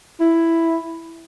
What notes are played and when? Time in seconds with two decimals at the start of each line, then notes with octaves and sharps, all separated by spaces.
0.20 E4